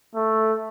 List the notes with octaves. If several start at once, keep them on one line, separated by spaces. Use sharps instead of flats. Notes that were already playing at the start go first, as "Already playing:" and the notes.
A3